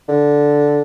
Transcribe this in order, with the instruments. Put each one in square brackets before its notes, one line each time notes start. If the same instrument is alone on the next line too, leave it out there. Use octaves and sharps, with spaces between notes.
[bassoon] D3